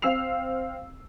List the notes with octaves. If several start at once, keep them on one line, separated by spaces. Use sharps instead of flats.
C4 F5 E6 C7 F7